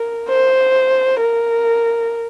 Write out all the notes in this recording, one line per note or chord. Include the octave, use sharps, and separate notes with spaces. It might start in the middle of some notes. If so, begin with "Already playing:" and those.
Already playing: A#4
C5
A#4